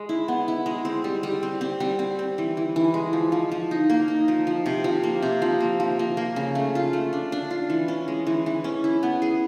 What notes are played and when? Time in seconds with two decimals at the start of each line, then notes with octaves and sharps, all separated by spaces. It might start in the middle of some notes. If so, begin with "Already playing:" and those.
Already playing: G#3
0.09 E4
0.28 B3
0.48 E4
0.66 G#3
0.85 C4
1.04 G3
1.23 G3
1.43 C4
1.61 C4
1.80 G3
1.99 C4
2.19 C4
2.38 E3
2.57 E3
2.76 E3
2.94 G#3
3.13 F3
3.32 F3
3.52 F3
3.71 D#4
3.90 A#3
4.08 D#4
4.28 F3
4.47 F3
4.66 C3
4.84 F3
5.04 A#3
5.22 C3
5.42 F3
5.60 A#3
5.80 F3
5.99 A#3
6.17 A#3
6.36 C#3
6.55 A3
6.75 F4
6.93 A3
7.13 D4
7.32 D4
7.51 F4
7.70 E3
7.88 C#4
8.08 G#3
8.27 E3
8.46 E3
8.64 C#4
8.84 E4
9.03 B3
9.22 G#4